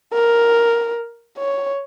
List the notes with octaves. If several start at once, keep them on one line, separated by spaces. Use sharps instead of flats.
A#4
C#5